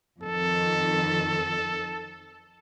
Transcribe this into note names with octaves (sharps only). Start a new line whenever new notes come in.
F2 D#3 A4